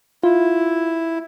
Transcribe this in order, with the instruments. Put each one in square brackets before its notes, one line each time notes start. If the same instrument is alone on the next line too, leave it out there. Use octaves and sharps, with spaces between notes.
[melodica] E4 [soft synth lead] F4